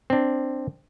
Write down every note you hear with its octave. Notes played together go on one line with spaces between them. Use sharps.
C4 D4